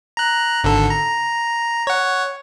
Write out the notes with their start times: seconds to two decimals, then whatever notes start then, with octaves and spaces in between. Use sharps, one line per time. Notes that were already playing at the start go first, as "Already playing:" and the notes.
0.17 A#5 F#6
0.64 G#1 D3 A4
0.90 A#5
1.87 C#5 F#5